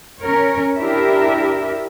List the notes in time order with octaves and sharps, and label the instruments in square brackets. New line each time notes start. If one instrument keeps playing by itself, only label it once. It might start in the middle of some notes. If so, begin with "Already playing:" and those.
[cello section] C#4 A#4 C#5
D4 E4 G4 A#4 E5